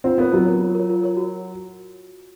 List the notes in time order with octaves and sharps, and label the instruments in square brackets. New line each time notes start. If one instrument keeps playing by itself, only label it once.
[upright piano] C4 [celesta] F4
[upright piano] B3 [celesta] A#4 C#5
[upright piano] F#3 [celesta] F4
[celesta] A#4 C#5
F4
A#4 C#5
F4
A#4 C#5
F#4